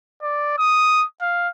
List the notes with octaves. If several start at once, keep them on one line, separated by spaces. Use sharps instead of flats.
D5
D#6
F5